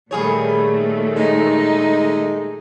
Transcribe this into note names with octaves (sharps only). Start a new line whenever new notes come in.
A#2 D#3 G3 A3 G#4 C#5
G#3 D#4